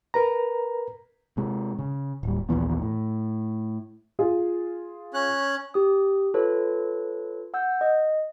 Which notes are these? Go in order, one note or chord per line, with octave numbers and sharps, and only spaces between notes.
A#4 B4 A#5
C3 G#3
C#3
D1 G3
A#1 D#2 E3 B3
A2
F4 G#4
C#4 F#6
G4 D#6
F4 A4 B4 C#5
F#5 E6 G6
D#5